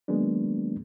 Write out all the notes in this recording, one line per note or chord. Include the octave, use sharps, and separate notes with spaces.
D#3 F#3 G#3 A#3 B3 D4